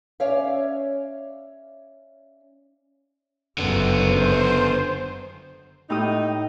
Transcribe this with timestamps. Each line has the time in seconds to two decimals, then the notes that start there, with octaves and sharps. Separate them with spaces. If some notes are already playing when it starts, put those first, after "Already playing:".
0.20 C#4 C#5 D5 E5 F5
3.58 F#1 D3 B3
4.05 C5
5.90 A2 D#4 G4 D#6